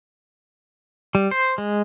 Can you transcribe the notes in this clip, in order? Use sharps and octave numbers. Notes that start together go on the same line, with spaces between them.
G3
C5
G#3